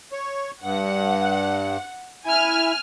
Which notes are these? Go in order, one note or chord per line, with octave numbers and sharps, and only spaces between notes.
C#5
G2 F#5
E4 G#5 F6